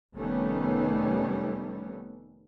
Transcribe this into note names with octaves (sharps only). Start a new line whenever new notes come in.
F1 D#3 G3 A3 B3 C#4